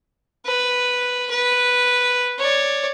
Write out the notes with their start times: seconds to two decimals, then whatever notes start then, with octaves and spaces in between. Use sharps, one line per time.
0.45 B4
1.30 B4
2.38 C#5 D5